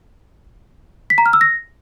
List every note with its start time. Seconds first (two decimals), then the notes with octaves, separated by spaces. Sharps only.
1.10 B6
1.18 A#5
1.26 F6
1.33 E6
1.41 A#6